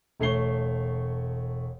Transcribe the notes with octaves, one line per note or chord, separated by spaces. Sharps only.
E1 A3 C#5 C7 G7